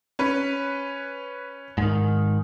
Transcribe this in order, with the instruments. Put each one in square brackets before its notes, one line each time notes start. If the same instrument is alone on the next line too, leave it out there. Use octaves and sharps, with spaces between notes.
[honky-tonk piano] C#4 B4
[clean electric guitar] G#2 D#3